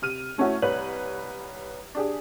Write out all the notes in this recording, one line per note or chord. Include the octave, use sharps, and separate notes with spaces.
C3 F6 D#7
A3 C#4 E4 F#4
C2 B4 C#5 F#7
D4 G4 G#4